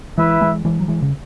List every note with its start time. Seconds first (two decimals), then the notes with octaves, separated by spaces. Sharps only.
0.18 E3 G#3 E4 B4 E5
0.41 E3 G#3
0.65 E3 G#3
0.80 F#3
0.88 E3 G#3
1.02 C#3